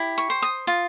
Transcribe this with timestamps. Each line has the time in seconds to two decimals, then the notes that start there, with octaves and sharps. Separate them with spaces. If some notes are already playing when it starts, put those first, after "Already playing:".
Already playing: E4 G4
0.18 C#6
0.30 C5
0.42 D#6
0.67 F4